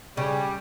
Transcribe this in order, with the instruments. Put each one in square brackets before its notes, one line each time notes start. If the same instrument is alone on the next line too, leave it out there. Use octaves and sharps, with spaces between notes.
[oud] C#3 [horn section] G3